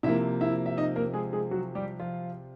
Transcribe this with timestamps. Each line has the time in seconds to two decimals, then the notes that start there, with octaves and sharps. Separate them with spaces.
0.03 C3 F3 A#3 E4 E5
0.41 E4 E5
0.66 E5
0.77 D#4 D#5
0.96 A#3 A#4
1.14 G#3 G#4
1.33 G#3 G#4
1.51 F#3 F#4
1.75 G3 G4
2.00 F3 F4